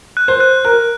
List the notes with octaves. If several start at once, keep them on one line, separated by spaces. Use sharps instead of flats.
F#6
C5
F#6
A#4 F#6